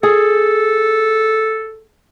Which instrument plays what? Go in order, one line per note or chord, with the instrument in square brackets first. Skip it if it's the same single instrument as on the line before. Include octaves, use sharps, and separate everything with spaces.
[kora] G#4 [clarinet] A4